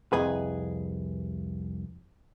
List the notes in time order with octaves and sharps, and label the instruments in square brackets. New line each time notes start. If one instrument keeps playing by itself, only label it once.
[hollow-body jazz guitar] C2 F2 G#4 B4